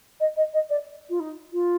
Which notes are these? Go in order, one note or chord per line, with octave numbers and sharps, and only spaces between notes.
D#5
D#5
D#5
D5
F4
D#4
F4